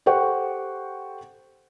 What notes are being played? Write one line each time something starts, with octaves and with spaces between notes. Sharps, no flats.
G4 A4 C5 F#5 G5 C#6